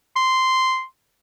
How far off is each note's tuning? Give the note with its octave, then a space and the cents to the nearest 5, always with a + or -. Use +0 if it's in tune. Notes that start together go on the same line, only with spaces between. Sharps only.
C6 -10